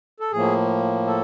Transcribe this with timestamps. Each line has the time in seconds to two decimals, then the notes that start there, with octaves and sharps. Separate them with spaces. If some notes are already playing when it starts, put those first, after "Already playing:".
0.20 A4
0.32 A2 F3 A#3 G#4
1.07 A4